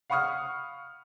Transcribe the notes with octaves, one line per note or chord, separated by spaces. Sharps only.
F5 F#5 B5 C#6 D#6 F6